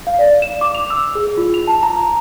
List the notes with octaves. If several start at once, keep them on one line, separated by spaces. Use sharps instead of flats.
F5
D5
E7
D6
F7
E6
G#4
F4
F7
A5
A#5
A#5